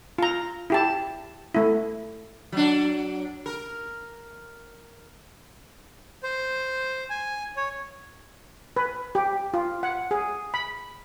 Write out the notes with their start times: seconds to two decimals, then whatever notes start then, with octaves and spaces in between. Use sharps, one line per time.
0.18 F4 A#5
0.70 E4 G4 A5
1.55 A3 E4
2.52 F#3 D4
3.46 A#4
6.23 C5
7.10 G#5
7.57 C#5
8.77 B4
9.15 G4
9.54 F4
9.83 F#5
10.11 G#4
10.54 B5